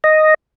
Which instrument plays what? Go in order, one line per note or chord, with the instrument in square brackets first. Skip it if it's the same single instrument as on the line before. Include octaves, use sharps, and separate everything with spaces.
[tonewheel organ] D#5